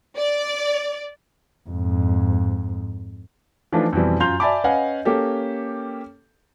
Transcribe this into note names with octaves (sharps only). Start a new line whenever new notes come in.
D5
F2 G#2
E3 F3 A3 D4 D#4 F4
F2 B2 E3 G3
F#2 F4 A#5 C6 G6 F7
D5 E5 G#5 A5 B5 D6
C#4 B4 D#5 F5 F#5 G#5
A#3 C#4 G4 A4